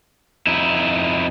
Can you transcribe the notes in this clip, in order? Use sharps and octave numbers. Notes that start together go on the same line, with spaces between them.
F2 D#4 E4